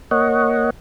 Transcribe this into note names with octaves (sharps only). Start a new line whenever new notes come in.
A#3 C#5 D#5 F#5